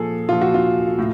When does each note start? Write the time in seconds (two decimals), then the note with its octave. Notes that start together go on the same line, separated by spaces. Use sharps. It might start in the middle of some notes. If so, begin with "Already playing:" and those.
Already playing: A#2 F3 G#4 A4
0.29 A#2 F3 F4
0.41 F#4
0.54 F4
0.98 A2